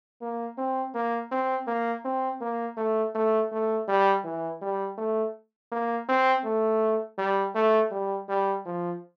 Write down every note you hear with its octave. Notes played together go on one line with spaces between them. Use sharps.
A#3
C4
A#3
C4
A#3
C4
A#3
A3
A3
A3
G3
E3
G3
A3
A#3
C4
A3
G3
A3
G3
G3
F3